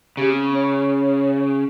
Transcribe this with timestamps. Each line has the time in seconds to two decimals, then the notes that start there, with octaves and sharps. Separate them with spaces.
0.17 C#3 G4
0.31 C4
0.54 C#5